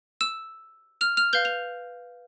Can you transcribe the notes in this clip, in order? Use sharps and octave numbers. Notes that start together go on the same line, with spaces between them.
E6 E7
F6 F7
F6 F7
B4 F5 G6 G7
F7